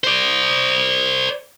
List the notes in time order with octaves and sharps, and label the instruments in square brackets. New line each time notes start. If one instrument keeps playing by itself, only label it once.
[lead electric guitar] C5 D5